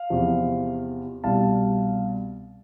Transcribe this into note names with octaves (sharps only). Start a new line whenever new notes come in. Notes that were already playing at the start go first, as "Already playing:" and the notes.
Already playing: F5
E2 C3 F3
C2 B2 G3 F5 A5